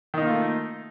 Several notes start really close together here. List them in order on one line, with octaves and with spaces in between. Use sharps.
D#3 D#4 A#3 F4 A3